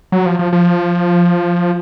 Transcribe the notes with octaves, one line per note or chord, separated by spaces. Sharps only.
F#3
F3
F3
F3